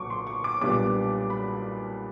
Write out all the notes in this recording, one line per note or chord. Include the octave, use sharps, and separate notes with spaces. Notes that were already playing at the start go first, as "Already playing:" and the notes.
Already playing: B1 A#2 F#3 C#6 D6
C6
C#6
D6
B1 A#2 G3 B3 D4 D6
B5